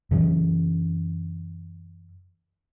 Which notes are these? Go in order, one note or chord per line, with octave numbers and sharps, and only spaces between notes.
F#2 C#3 E3 F#3